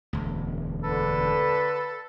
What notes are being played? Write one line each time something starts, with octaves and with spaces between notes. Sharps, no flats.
E1 D2
D3 A4 B4